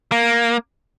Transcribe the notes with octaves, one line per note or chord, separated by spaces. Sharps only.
A#3